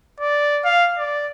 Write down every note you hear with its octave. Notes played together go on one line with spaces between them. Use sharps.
D5
F5
D5